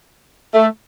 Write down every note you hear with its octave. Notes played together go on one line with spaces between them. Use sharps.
A3